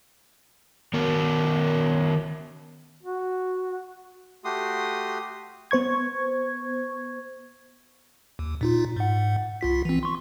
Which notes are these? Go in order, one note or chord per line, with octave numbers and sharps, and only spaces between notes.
D#3 B3 A#4
F#4
A3 F#4 G4 C6 D#6
B3 C5 C#6 G#6
D#2
A#2 D#4 F4
G#2 F#5
C2 F4 B6
E3 C4
C6 C#6